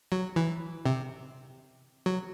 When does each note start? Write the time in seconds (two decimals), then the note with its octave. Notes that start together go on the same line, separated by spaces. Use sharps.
0.12 F#3
0.36 E3
0.86 C3
2.06 F#3